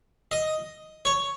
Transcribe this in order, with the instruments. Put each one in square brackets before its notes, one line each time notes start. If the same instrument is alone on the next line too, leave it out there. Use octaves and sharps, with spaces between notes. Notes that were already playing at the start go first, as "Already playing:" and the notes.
[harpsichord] D#5
C#5